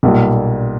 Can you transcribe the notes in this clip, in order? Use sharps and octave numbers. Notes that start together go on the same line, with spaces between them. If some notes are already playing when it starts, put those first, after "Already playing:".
B1 A#2 G3